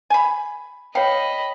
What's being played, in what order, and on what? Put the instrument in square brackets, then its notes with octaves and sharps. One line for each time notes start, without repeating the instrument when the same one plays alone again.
[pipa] G#5 B5
[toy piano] C#5 G5 [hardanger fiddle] D#5 B5 [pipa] F5